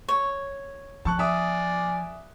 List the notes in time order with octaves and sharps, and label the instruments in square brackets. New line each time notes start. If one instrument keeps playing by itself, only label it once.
[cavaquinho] C#5
[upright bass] F3 [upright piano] A5 C#6 F#6
[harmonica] D5 G#5 [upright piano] E5 D#6